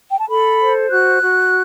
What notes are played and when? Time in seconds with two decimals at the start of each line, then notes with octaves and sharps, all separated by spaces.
0.10 G5
0.19 A5
0.29 A4 B5
0.60 C5
0.91 F#4 F#6
1.21 F#4